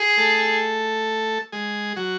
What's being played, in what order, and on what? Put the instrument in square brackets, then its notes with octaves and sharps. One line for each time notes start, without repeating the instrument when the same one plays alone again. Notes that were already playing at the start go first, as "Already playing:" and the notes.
Already playing: [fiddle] G#4
[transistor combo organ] A3 A4
G#3 G#4
F#3 F#4